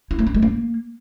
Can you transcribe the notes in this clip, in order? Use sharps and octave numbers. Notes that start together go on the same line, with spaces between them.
E4
A#3
B3
G#3
A#3